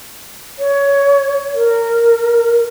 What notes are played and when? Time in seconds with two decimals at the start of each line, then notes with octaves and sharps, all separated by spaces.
0.59 C#5
1.55 A#4